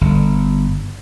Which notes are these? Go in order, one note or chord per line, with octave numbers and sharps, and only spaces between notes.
G1